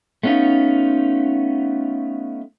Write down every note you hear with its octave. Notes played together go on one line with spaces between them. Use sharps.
A3 B3 C#4 D#4 F4